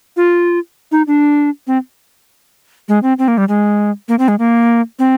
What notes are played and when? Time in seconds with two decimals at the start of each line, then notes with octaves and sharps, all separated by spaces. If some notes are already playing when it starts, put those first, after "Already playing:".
0.17 F4
0.92 D#4
1.07 D4
1.67 C4
2.88 G#3
3.03 C4
3.19 C4
3.28 A#3
3.38 G3
3.49 G#3
4.08 A#3
4.19 C4
4.28 G#3
4.39 A#3
4.99 C4